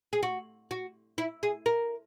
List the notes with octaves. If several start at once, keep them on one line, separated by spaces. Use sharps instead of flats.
G#4
F#4
F#4
E4
G#4
A#4